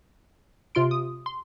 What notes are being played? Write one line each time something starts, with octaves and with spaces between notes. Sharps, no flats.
C3 F4 C6 D7
D#6
C6